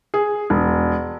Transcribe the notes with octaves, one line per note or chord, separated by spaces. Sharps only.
G#4
E1